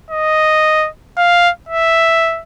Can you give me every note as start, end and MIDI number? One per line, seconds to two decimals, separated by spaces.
0.11 0.89 75
1.17 1.50 77
1.69 2.42 76